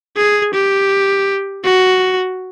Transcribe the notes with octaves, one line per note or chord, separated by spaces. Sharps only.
G#4
G4
F#4